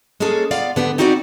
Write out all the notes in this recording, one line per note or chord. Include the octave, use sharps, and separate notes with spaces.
G#3 A#3 C#4 G#4 A4
B3 F4 D5 F5
D3 B3 G4
C4 D#4 E4 F#4 C#5 D5